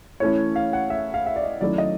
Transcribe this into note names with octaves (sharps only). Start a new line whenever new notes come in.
E3 A3 C#4 E4 C#5
F5
F#5
E5
F5
E5
D5
D#5
D#3 F#3 A3 C#4 E4 D5
D#5